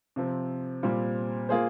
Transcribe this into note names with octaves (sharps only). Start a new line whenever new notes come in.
C3 F3 C4
A#2 G3 C4 F4
A#3 F4 G#4 C5